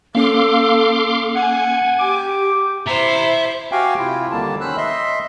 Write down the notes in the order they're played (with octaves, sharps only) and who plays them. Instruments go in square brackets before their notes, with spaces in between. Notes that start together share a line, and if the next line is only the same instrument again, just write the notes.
[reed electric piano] A#3 C#4 [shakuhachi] A4 [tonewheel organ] F5 C6 D6
[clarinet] F#5 [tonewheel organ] G#5
[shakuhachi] G4 [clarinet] D6
[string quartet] E4 C5 [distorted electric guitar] E5 A#5
[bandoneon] F#4 G4 F5 G5 G#5
C3 E4 F4
D#2 D3 G3 A#3 A5
D#3 C#4 C5 B5 E6 F#6
D#5 E5 C6